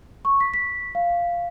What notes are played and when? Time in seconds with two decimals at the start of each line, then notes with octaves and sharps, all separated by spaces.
0.25 C#6
0.41 B6
0.54 B6
0.95 F5